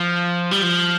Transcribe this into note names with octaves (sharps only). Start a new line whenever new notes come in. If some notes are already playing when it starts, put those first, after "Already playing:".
Already playing: F3
G3
F3